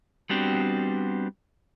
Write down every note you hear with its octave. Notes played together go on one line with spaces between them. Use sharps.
G3 B3 C4 D4 F#4 G4